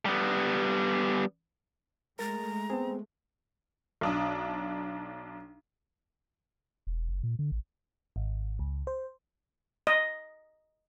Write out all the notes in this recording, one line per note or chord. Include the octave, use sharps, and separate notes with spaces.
G3 B3
G#3 A3 A#4 A#5 A6
B3 C4 G#4
B1 D4 D#6
E1
F#1
A#2
D3
A1
G#1
C#2
C5
D#5